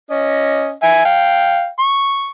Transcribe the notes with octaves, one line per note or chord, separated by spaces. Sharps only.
C#4 D#5
E5 G#5
F5 G5
C#6